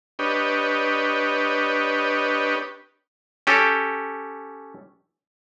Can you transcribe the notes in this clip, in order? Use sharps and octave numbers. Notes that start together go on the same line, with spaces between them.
D4 G4 B4 C#5 D#5
C#4 G4 A4